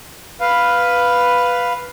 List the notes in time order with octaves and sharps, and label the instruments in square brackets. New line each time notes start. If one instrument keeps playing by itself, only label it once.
[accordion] B4 F5